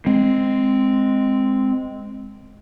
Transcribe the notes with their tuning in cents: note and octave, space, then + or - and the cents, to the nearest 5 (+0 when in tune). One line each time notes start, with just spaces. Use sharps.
G#3 +0 C4 +0